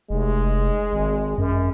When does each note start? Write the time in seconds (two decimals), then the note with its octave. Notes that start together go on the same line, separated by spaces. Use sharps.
0.10 F1 G#3
0.93 G#1
1.38 F#2